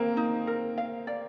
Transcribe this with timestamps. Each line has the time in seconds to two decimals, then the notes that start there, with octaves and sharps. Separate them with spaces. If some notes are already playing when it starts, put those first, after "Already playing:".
Already playing: A#3 C4 F5
0.17 D#4
0.47 A#4
0.78 F5
1.07 D5